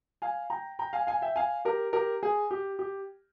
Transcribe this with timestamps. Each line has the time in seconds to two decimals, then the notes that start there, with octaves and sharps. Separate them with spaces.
0.22 F5 G#5
0.50 G5 A#5
0.79 G5 A#5
0.93 F5 G#5
1.07 F5 G#5
1.22 E5 G5
1.36 F5 G#5
1.65 G4 A#4
1.93 G4 A#4
2.23 G#4
2.51 G4
2.79 G4